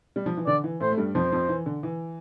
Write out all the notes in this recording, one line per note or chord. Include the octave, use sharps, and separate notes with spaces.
G3
F3
E3
D3 D5
E3
A2 A3 C5
A3
G2 G3
F2 F3 C5
F2 F3
E3
D3
E3